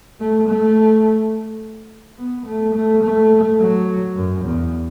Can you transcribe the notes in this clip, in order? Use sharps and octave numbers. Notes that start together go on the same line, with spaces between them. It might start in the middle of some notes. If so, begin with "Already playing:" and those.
A3
A3
B3
A3
A3
A3
F#3
F#2
E2